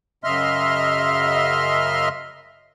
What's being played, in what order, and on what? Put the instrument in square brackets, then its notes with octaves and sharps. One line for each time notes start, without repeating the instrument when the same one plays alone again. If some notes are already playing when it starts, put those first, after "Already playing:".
[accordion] F#2 C#3 D#5 E5 C6 F6